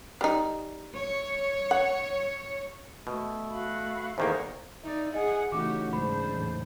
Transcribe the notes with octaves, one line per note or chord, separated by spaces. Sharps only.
G3 D#4
C#5
F#5
B2 A3
F#4 F5 B5
E2 D#3 A#3 A4 C5 F#5 A#5 C#6
D#4 D5 E5
G#4 D#5 F#5 G#5
C#3 E3 A3 C#4 D#4 F#4 G4 D6
G#2 C#3 F#3 G#3 D4 C5 B5
E2 A2